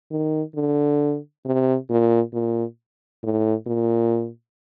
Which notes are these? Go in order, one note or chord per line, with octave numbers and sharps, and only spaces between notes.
D#3
D3
C3
A#2
A#2
A2
A#2